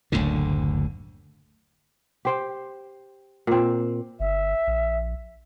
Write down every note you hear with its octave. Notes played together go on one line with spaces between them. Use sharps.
F#1 D2 A2 D3
G4 C5 G5
A#2 C4
G1 E5
A#1